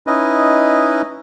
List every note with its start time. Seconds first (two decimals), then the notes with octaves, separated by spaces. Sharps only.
0.07 C#4 D#4 E4 B4 D#5